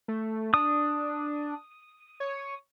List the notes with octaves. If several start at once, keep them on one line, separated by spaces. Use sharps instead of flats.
A3
D4 D#6
C#5